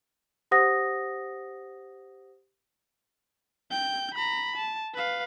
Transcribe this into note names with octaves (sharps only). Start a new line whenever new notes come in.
G4 C5 F#5 D#6 A#6
G5 G6
A#5 B5
A5
B4 F5